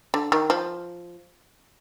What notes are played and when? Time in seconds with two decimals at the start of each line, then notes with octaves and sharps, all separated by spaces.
0.14 D3
0.32 D#3
0.50 F3